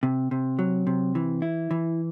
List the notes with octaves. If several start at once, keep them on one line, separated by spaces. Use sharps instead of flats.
C3
C3
F#3
C3
E3
E4
E3